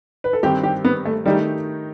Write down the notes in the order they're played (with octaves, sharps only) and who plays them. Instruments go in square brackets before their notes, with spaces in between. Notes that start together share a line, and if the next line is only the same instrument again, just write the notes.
[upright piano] B4
A4
[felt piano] G2 D#3 G3 C4 [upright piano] G4
[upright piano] G4
B3
A3
[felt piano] D#3 A3 D#4 G4 [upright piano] G3